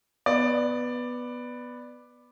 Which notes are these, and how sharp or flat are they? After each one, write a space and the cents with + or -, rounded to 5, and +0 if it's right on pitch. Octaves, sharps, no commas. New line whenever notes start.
B3 +0 D5 +10